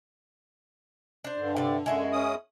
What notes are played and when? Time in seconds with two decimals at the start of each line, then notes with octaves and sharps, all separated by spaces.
1.24 D4 C5
1.38 G2 D3
1.56 C3 D5
1.86 F#2 G#3 E4 F#4
2.12 C#4 D#6